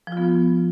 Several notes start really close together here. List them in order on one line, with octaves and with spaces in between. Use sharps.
F3 F4 B3